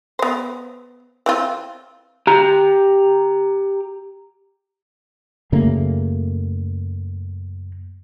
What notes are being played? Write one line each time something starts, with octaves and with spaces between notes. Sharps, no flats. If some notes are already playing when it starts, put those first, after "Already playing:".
B3 C5
E3 C4 F4
G4 A#5
F#2 C#3 A3 A#3